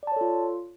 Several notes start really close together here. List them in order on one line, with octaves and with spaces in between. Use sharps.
D5 A5 C#5 A4 F4